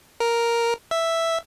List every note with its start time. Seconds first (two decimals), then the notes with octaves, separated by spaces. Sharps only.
0.20 A#4
0.91 E5